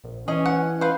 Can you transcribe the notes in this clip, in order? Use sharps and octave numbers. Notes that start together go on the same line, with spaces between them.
A#1
E3 C#4 G#4 D#5
F#5
B4 C5 F5